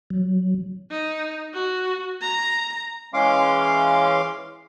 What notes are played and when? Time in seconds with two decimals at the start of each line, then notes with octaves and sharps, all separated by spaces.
0.10 F#3
0.90 D#4
1.53 F#4
2.21 A#5
3.14 E3 G#3 C#4 F5 C6 D6